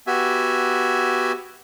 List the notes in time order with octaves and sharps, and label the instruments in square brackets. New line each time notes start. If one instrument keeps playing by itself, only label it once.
[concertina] B3 F#4 G4 E5 G#5